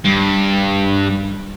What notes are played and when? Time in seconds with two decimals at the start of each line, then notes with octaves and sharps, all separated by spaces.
0.05 G2